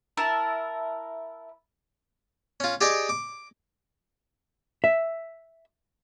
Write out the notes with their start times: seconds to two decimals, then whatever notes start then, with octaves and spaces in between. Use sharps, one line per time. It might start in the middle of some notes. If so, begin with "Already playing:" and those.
0.17 E4 A#4 A5
2.60 C#4 F4
2.81 G4 G#4 D5 D#5 G5 G#5
3.09 D6
4.84 E5